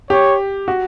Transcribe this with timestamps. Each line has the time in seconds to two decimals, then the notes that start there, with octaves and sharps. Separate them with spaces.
0.10 G4 C#5
0.68 F#4